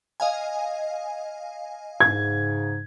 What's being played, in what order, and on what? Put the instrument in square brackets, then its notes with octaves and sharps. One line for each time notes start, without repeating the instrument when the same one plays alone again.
[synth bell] D#5 F5 G#5
[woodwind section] G#2 C#3 [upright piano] G#6